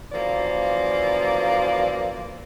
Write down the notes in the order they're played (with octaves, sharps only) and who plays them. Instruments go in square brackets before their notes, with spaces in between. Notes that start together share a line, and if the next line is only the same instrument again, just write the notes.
[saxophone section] F#2 E3 F3 A#3 D5